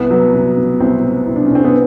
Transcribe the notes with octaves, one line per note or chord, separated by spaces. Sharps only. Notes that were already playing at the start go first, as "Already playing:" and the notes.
Already playing: C2 B3
F#3
C2
B2
C2 C4
B2
C2
D4
C2 C#4
C4
B3